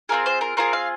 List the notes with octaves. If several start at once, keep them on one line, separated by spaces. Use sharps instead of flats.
C4 F4 G#4 A#4
C5
A#4
C4 F4 G#4 A#4
F5